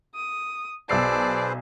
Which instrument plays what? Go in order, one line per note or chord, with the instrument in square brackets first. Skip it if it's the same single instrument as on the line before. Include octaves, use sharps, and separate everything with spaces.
[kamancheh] D#6
[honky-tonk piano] B1 E6 C7 [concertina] G#4 B4 C5 [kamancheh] D5 A5